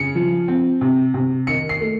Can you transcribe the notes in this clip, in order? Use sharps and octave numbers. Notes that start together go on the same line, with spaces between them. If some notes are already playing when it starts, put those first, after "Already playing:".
Already playing: C#3 C#7
F3
C4
C3
C3
D#3 C#7
C7
A3